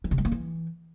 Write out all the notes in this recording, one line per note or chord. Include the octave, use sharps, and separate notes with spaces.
E3
C3
G#3
A#3
E3